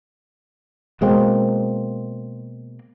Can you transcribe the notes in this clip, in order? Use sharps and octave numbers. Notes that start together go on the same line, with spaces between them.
B2 G#3 A#3 C4